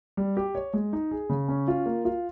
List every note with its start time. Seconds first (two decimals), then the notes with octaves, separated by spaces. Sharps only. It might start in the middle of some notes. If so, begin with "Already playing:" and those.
0.17 G3
0.37 G4
0.55 C#5
0.73 G#3
0.93 D#4
1.11 G#4
1.29 C#3
1.48 C#4
1.68 F4
1.86 A#3
2.05 F4